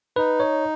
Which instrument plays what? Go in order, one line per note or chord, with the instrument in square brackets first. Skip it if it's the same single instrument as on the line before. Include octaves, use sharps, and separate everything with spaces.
[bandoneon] D#4 [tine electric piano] B4
[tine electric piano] C#5